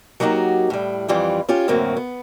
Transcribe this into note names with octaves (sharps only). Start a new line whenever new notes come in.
F#3 A#3 D#4 F#4 G4
A2 G3
F2 E3 G3 F4
C#4 F4 G4
F#2 A2 D3 A#3 C4 F#4
B3